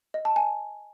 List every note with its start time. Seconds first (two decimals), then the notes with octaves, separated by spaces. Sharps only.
0.14 D#5
0.25 A5
0.36 G#5